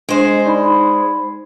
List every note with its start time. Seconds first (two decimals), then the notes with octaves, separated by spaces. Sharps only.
0.09 G#3 D4 C5 D#5
0.46 D#4 D5 B5